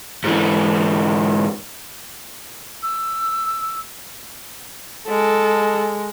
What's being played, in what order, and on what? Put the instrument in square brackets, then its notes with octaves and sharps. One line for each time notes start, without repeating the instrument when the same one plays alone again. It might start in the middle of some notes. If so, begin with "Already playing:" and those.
[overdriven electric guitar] G#2 E3
[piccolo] E6
[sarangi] G#3 [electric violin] A4